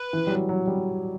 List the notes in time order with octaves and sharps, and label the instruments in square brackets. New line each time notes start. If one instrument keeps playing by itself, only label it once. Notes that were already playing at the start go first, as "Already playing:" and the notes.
Already playing: [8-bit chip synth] B4
[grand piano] E3
G3
F#3
F#3
G3